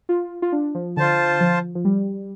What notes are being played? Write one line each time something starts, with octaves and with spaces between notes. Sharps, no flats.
F4
F4
D4
F3
D3 F4 C5 A5
F3
F3
G3